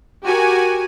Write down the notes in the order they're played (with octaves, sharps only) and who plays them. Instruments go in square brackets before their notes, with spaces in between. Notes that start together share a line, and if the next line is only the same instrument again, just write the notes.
[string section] F#4 G4 A#4 G#5